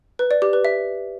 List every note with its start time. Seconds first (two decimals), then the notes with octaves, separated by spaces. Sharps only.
0.19 B4
0.31 D5
0.42 G4
0.53 B4
0.65 E5